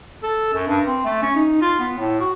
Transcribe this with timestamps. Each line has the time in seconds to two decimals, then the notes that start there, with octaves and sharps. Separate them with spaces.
0.23 A4
0.53 F#2
0.67 G2
0.86 C4
1.05 A3
1.22 C#4
1.36 D#4
1.61 F4
1.79 B3
1.98 A2
2.20 F#4